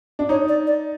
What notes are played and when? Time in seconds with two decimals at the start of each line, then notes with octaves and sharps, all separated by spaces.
0.19 D4
0.29 D#4 C#5
0.48 D5
0.67 D5